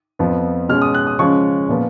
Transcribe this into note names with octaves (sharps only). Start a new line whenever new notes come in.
F2 F3 B3
B2 G#3 C#4 F6
D#6
F#6
D#6
C#3 F3 G#3 C#4 C#6
A#2 F3 B3